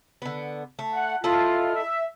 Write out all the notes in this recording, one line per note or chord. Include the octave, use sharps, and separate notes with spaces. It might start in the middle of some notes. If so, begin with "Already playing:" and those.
D3 B3
A3
F#5
E4 F4 A4 D#5
E5